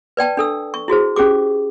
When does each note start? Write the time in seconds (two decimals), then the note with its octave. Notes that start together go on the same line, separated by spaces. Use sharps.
0.17 B4 D5 G5 A5
0.37 D4 A4 E6
0.74 C#6
0.88 E4 F#4 G#4 C5
1.16 C#4 G4 G#4 D6